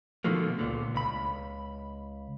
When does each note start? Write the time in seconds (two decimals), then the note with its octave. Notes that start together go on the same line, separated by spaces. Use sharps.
0.24 B2 D3 D#3 F3 A3 A#3
0.59 C#2 A#2 D3
0.94 C#2 B5